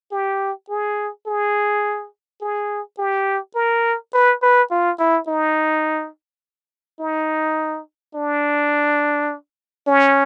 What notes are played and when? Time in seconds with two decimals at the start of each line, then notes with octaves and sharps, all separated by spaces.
0.12 G4
0.69 G#4
1.26 G#4
2.41 G#4
2.98 G4
3.55 A#4
4.13 B4
4.42 B4
4.71 F4
4.99 E4
5.28 D#4
7.00 D#4
8.15 D4
9.87 C#4